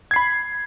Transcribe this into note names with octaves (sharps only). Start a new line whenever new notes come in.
B5 G#6 C7